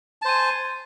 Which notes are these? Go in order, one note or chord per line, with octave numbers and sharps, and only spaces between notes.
C5 G#5 A5